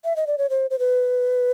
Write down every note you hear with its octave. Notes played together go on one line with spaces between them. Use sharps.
E5
D#5
D5
C#5
C5
C5
B4